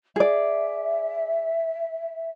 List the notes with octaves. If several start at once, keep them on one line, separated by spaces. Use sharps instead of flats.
G#4 D5 E5